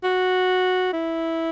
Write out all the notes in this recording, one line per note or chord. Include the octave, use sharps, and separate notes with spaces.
F#4
E4